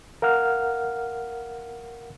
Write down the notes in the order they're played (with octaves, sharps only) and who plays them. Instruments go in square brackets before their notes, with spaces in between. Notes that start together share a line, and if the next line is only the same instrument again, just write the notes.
[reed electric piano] A#4 F5 F#5 F6